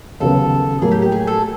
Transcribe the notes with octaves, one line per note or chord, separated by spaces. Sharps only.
D#2 C#3 F#3 B3 A4
A2 F#3 A#3 G#4
G4
G4
G#4
A4